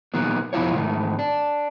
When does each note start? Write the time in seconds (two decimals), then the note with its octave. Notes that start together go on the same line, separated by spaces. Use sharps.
0.14 A#2 D#3 F#3 B3
0.53 F2 B2 E4 F4 C#5
0.75 G#2 D#3 A3
1.19 D4